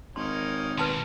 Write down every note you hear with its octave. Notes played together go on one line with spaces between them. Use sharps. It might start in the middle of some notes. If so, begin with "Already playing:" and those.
G#1 A#3 C#4 D#4 C6
D#2 B2 B4 A5 C6